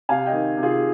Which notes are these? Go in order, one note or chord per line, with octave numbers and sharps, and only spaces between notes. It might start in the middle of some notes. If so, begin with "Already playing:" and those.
C3 F5 G#5
D#5 G5
D#3
C3
F4 G#4